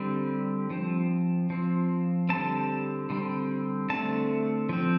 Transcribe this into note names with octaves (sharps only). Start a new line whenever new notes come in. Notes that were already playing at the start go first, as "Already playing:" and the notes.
Already playing: D3 G3 C4
F3 C4
F3 C4
D3 G3 C4 A5
D3 G3 C4
D3 A3 C4 A5
F3 C4